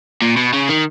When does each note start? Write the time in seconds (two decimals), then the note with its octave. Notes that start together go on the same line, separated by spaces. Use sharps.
0.22 A#2
0.37 B2
0.54 C#3
0.69 D#3